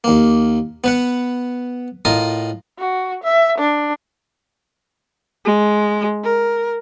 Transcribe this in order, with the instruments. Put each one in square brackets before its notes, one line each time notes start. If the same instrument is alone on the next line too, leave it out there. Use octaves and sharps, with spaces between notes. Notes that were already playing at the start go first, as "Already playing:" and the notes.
[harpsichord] D#2 A#3
B3 B4 F#5
A2 F4 A#4 D#5 D#6
[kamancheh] F#4
E5
D4
[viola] G#3
A#4